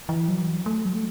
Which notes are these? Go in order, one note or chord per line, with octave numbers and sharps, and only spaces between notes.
E3
F#3
A3
F#3
A3